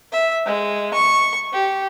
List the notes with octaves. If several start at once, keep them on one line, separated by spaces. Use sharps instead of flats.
E5
G#3
C#6
G4